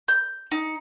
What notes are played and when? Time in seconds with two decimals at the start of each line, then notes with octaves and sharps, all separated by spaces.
0.08 G6
0.52 D#4